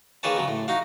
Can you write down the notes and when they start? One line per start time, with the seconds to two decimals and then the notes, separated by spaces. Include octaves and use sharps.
0.23 D#3 A#3 G#4 B4 C#5 A5
0.36 C#3 F#3 G#3
0.48 A2
0.68 D#4 F#4 F5